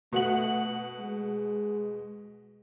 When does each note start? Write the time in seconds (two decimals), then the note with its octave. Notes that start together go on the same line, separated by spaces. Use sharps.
0.13 B2 A3 F#5 F#7
0.99 G#3